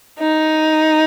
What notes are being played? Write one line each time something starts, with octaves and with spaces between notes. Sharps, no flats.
D#4